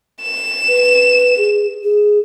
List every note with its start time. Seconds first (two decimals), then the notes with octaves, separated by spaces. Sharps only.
0.22 E7
0.68 B4
1.38 G#4
1.84 G#4